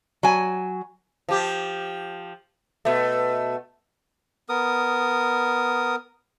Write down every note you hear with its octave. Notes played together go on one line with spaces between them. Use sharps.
F#3 G#5
F3 G4
B2 A3
B3 A#4 D#6